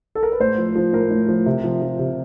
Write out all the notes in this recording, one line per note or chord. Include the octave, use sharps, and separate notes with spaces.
A4
A#4
B4
A2 C5
F3
F3
A2 A#4
A2
F3
C3
F3
F3
C3